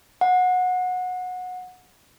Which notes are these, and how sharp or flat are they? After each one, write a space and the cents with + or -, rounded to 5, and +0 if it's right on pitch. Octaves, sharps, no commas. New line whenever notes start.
F#5 -20